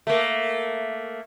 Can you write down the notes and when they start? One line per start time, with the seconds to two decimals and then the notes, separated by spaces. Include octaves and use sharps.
0.07 A3 A#3